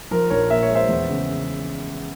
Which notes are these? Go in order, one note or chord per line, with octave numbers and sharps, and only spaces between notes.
F3 A#4
A#1 A#4 C#5
A#2 E5
C#5
G#3
C5 E5
E2
C#3